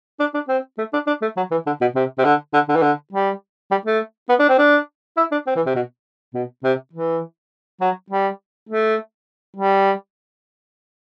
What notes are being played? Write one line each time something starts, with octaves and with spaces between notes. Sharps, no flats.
D4
D4
C4
A3
D4
D4
A3
F#3
E3
D3
B2
C3
C3
D3
D3
D3
E3
D3
G3
G3
A3
B3
D4
C4
D4
E4
D4
C4
E3
C3
B2
B2
C3
E3
F#3
G3
A3
G3